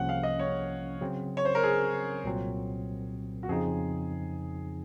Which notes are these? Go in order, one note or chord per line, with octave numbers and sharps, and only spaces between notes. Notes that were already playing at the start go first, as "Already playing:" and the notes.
Already playing: C2 C3 F3 A#3 C#4 F#5
F5
D#5
C#5
C#3 F#3 C4
C#5
C5
A#4
G#4
C2 A#2 F#3 C4
F#4
F2 C#3 F3 C4 D#4 G#4